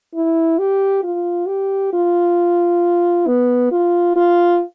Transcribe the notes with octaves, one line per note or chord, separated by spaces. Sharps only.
E4
G4
F4
G4
F4
B3
F4
F4